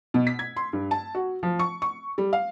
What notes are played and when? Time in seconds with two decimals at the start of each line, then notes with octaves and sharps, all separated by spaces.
0.14 B2
0.27 B6
0.39 G#6
0.56 C6
0.73 G2
0.91 A5
1.15 F#4
1.43 F3
1.59 C#6
1.82 C#6
2.18 G3
2.33 F5